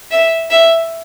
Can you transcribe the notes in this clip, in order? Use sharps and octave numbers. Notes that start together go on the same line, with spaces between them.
E5
E5